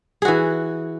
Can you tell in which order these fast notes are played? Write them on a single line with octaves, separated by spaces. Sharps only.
G#4 F#4 E3